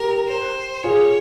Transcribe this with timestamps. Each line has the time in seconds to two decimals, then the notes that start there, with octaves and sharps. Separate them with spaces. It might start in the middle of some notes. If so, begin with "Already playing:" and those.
Already playing: G4 A#4
0.28 C5
0.84 F4 G#4 C#5